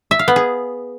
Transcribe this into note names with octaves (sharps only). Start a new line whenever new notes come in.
E5
F5
B3
G#4